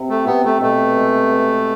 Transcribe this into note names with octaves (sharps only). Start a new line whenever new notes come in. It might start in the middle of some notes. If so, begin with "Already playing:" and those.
Already playing: C3
A3
C3 B3
A3
B2 A3
G#3
B3